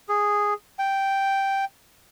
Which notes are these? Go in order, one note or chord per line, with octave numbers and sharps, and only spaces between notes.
G#4
G5